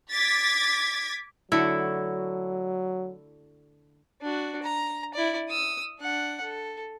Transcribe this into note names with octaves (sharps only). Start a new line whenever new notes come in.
D6 G#6 A6 B6
D3 F#3 A3 E4 F#4
D4 F#4
A#5
E4 D5
D#6 E6
D4 F#5
A4